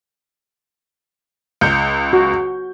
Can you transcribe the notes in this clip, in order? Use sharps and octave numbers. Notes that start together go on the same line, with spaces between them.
C#2 G6 C#7
F#4